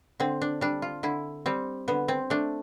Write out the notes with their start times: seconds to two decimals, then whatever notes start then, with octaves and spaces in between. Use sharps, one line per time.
0.20 D3 C4
0.41 D4
0.61 G3 D4
0.82 F4
1.03 D3 E4
1.46 G3 C4
1.88 D3 B3
2.08 C4
2.30 A3 D4